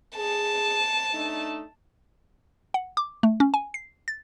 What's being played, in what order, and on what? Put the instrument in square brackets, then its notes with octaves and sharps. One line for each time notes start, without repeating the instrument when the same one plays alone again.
[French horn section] G#4 [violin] A5
[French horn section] A3 D4 D#4
[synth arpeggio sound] F#5
D6
A3
C#4
G#5
C7
A6